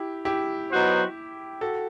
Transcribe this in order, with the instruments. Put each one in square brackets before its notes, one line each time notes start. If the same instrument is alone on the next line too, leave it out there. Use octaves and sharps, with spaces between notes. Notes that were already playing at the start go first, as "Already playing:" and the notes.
Already playing: [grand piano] E4 G4
E4 G4
[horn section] F#3 B3 D#4 F#4 C5
[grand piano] F#4 A4